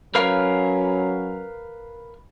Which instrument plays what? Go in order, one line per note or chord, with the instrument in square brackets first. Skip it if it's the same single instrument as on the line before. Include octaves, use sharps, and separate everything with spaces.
[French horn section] F#3 C#4 [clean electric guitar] A#4 B4 F5